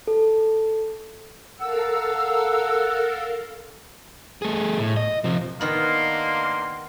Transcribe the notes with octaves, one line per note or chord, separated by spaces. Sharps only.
A4
A4 A#4 F5 F#5 E6
A3 G#4
A2
D#5
C3 F3
D#3 A#3 B3 D4 B4 F5 C6